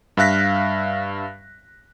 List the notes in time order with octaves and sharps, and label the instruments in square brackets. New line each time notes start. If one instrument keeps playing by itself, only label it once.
[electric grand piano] G2 E5 F5 F#6 A#6 B6